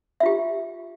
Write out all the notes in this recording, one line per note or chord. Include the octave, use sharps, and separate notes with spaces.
F4 G4 E5